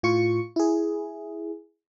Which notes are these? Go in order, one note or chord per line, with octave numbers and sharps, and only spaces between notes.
A2 F4 C#6 C#7
E4 G#4